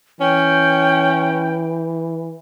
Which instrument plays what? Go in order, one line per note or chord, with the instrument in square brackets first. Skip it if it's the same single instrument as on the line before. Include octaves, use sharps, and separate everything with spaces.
[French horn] E3 [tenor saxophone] C#4 [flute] G5